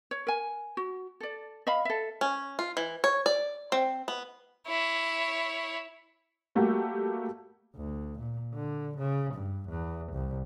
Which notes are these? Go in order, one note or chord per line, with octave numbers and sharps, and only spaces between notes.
C#5
A#4 G#5
F#4
A4 D5
D#5 F5 B5
A4 E5
C#4
F4
E3
C#5
D5
C4
B3
E4 C#5
G3 A3 A#3 F#4 G4
D2
A#2
D3
C#3
G2
E2
C2